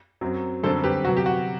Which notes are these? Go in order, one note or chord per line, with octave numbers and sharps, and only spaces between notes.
F#2 F#3 C4
F#2 D3 G3 C4 A4 C5
G4 B4
C3 F#3 B3 F#4
G4
F#4